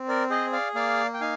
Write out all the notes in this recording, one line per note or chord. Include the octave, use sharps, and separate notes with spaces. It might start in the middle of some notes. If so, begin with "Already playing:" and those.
Already playing: C4
A#4 D5
G#4 C5 D#5
D5 F5
A#3 D5 F5
G5
D#4 F5 G#5